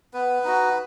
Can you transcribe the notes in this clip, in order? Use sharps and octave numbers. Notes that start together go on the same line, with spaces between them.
B3 B4
D#4 F#4